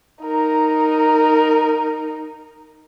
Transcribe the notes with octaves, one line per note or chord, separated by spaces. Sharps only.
D#4 A#4